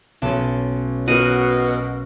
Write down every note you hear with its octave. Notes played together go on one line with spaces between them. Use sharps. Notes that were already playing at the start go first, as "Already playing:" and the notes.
B1 C#4 A5
B2 F#4 A#4 D#7